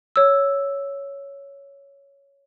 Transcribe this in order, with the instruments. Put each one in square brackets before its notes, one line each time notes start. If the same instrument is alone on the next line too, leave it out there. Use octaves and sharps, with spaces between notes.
[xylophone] C#5 E6